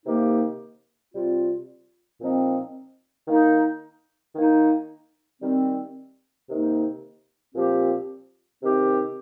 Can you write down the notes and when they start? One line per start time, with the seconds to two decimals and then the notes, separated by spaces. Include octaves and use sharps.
0.05 C3 D#3 A#3 D#4 G4
1.14 C3 G3 C4 F4
2.20 A#2 F3 C4 D#4
3.28 D#3 A#3 D#4
4.35 D#3 A#3 D#4
5.41 D#3 G3 C4
6.49 C3 D#3 A#3 D#4
7.55 A#2 F3 C4 G4
8.62 C3 D#3 C4 G4